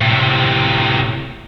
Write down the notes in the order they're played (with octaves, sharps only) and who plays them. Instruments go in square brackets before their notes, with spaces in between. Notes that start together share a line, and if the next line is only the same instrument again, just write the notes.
[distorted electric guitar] A2 C3